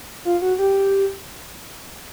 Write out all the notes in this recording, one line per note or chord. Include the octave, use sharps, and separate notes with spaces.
F4
F#4
G4